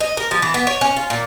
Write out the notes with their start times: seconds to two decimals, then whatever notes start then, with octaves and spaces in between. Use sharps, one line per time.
0.01 D#5
0.17 A#4
0.31 F3
0.42 E3
0.54 B3
0.67 C#5
0.81 C#4
0.96 F4
1.10 A#2